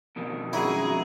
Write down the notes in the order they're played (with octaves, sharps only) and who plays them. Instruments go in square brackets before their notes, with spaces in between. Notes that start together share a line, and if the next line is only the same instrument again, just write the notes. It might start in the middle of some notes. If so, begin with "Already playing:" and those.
[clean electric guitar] F2 B2 D#3
[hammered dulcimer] F#3 [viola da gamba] G#3 C#4 G#4 [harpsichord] E4